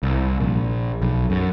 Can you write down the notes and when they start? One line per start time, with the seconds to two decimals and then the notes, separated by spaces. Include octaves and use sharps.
0.03 C2
0.41 A#1
1.02 B1
1.30 F#2